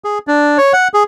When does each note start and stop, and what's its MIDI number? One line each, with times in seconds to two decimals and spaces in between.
0.04 0.18 68
0.27 0.58 62
0.58 0.73 73
0.73 0.88 78
0.94 1.03 68